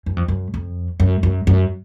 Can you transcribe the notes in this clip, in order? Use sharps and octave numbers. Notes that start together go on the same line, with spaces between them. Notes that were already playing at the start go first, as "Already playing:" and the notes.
F#2
F2
F#2
F2
F#2
F#2
F#2